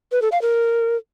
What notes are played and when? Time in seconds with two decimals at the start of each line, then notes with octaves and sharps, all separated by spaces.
0.12 B4
0.22 A4
0.32 F5
0.42 A#4